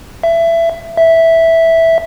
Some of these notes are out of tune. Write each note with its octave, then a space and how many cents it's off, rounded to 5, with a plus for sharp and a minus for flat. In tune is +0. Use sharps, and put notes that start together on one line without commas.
E5 +20
E5 -5